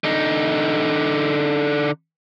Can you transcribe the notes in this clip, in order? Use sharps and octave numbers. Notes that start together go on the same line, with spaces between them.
D3 D#4